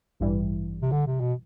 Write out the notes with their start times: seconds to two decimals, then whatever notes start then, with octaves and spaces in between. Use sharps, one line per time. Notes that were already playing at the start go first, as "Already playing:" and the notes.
0.20 A1 G2 E3 G3
0.82 C3
0.92 D3
1.06 C3
1.20 B2